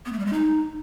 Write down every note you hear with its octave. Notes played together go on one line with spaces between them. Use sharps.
B3
A3
G3
G#3
D#4